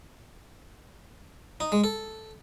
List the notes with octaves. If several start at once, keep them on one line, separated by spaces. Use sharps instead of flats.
D#4
G#3
A4